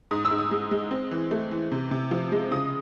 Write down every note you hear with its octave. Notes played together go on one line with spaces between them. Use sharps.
G#2 D#6
E6
G#2
D#6
G#3
G#3
C4
E3
A3
E3
C3
C3
F3
G#3
C#3 D#6